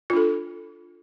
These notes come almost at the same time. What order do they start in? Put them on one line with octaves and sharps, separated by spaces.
F4 D4 A4